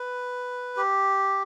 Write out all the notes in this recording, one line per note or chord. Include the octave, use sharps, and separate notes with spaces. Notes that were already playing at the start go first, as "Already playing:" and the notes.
Already playing: B4
G4